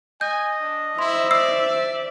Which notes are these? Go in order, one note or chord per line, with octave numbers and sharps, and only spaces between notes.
D#5 G#5 G6
D4
E4 C5 E5 C6
D5 E6 C7